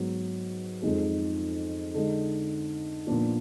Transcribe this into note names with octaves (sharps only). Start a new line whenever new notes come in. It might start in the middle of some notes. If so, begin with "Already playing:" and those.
Already playing: G#2 F#3 B3
F2 F3 G#3 D#4 G#4
D3 G#3 D#4
A#2 F3 B3 D4 F4